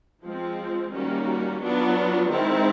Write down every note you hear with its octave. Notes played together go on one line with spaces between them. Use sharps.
F3 G#3 C4
D#3 G3 A#3 C#4 F#4
F#3 B3 D4 F4
D#3 G#3 C4 E4